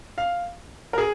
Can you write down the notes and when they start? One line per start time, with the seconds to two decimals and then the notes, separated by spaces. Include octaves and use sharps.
0.18 F5
0.93 A#4
0.98 G#4